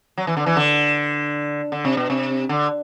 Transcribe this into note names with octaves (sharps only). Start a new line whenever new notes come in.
F#3
E3
D3
E3
D3
D3
C3
B2
C3
D3